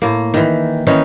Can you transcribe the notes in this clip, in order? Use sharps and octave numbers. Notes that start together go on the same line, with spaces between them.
A2 A#3
D#3 E3
D#3 E3 C#4 D#4